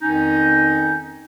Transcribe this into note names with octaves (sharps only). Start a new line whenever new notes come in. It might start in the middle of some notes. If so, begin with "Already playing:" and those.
F2 D#3 C#4 D#4